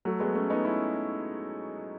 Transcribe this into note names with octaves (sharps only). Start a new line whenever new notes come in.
F#3 A3
G#3 B3
A3 C#4
B3 D#4
C#4 E4